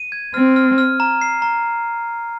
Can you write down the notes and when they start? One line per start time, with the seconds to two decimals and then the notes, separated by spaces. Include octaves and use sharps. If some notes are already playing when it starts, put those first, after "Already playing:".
Already playing: D#7
0.12 G#6
0.34 C4 F6
0.56 F6
0.78 F6
1.00 A#5
1.21 C7
1.42 A#5